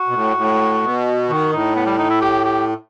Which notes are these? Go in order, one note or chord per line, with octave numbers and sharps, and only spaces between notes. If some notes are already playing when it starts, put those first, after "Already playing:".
Already playing: F#4
B2
A2
A2
B2
D#3 F#4
A2 D#4
B3
G3
D#4
E4
G4
G4